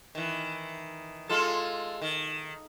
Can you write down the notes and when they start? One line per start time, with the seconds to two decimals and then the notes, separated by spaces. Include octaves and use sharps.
0.15 D#3 E3
1.29 G#3 F4 A4
2.01 D#3